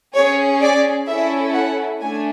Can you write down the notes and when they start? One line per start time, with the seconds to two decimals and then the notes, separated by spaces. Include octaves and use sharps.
0.15 G#4 C#5
0.20 C#4
0.62 D5
1.07 C#4 E4 A4 E5
1.54 F#5
2.01 A3 D4 G#5